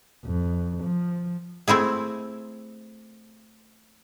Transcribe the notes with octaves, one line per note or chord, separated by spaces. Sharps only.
F2
F3
A3 C4 E4 G#4